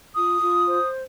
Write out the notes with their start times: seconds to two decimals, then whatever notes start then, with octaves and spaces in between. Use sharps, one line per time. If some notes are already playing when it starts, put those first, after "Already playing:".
0.15 F4 D#6
0.42 F4
0.68 C5